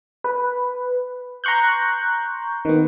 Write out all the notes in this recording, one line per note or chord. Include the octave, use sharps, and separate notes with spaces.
B4
A#5 C6 C#6 F#6 G6
D#3 B3